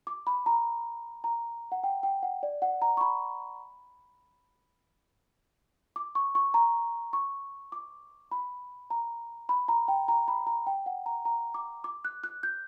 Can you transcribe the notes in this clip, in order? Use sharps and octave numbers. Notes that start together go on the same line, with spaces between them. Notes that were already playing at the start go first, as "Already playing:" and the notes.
D6
B5
A#5
A#5
F#5
G5
G5
F#5
D5
F#5
A#5
C#6
B5
D6
C#6
C#6
A#5
C#6
D6
B5
A#5
B5
A#5
G5
A#5
B5
A#5
G5
F#5
A#5
A#5
D6
D6
F#6
F#6
G6